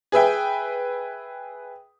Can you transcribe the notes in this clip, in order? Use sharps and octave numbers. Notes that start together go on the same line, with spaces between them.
G#4 B4 E5 G5